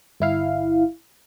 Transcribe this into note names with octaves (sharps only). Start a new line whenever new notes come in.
G1 E4 F5